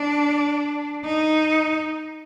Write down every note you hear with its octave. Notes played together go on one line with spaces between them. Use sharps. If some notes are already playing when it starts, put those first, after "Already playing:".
Already playing: D4
D#4